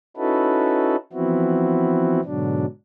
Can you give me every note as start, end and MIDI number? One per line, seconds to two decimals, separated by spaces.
0.17 0.96 61
0.17 0.96 63
0.17 0.96 64
0.17 0.96 66
0.17 0.96 69
0.17 0.96 71
1.13 2.21 52
1.13 2.21 53
1.13 2.21 59
1.13 2.21 60
1.13 2.21 64
1.13 2.21 66
2.24 2.66 44
2.24 2.66 47
2.24 2.66 50
2.24 2.66 54
2.24 2.66 62